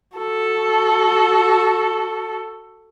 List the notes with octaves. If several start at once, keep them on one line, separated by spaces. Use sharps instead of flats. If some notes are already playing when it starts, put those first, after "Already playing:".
F#4 A4